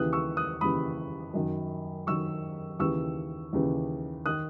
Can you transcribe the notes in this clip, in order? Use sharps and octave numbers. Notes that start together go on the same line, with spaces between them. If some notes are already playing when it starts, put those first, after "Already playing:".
Already playing: D#2 C#3 E3 D#6 F#6
C#6 E6
D#6 F#6
D#2 C#3 E3 B5 D#6
F#2 D#3
F#2 D#3 C#6 E6
D#2 C#3 E3 C#6 E6
D#2 C#3 E3
D#3 D#6 F#6